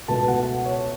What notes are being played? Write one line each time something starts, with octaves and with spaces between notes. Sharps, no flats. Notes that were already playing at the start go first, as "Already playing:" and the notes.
C#2 B2 A3 A5
F#5
C#5